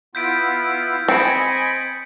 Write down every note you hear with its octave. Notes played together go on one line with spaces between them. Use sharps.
B3 E4 F4 G6 B6 D7
C4 D#5 G#5 B5 A6 C#7 D7